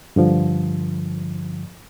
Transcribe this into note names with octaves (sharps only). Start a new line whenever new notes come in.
G2 D3 F3